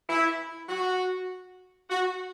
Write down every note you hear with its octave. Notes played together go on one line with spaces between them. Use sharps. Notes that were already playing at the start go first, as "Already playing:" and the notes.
E4
F#4
F#4